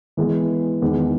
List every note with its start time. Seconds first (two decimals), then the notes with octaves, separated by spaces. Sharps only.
0.17 E3 G#3 B3
0.82 E2 D#3 G#3